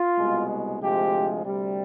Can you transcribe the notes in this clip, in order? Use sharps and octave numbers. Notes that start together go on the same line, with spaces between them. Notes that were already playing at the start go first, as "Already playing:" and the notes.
Already playing: F4
C2 B2 G#3
D2 C3 F3 G#3 G4
D2 C3 G3